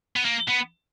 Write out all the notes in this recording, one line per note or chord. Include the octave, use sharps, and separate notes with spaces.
B3
A#3
B3